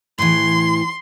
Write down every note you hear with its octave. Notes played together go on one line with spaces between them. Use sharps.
A2 E3 C6